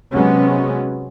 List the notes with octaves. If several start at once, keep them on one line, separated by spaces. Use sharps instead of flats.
C3 F#3 G#3 B3 C#4